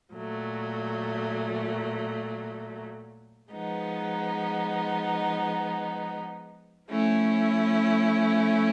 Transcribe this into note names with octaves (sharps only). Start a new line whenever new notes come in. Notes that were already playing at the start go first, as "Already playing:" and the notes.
A#2 F#3 A3
F3 G#3 B3 D#4
F3 A3 C#4 E4